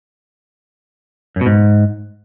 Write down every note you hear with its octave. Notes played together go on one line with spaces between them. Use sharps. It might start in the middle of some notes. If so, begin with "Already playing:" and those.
F#2
B2
G#2